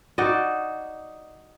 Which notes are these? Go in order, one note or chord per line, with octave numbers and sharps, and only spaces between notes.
D#4 F#4 D5 D#5